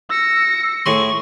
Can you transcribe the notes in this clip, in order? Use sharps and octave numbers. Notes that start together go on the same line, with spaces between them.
E6 A#6 C#7
A2 G#4 C6 C#6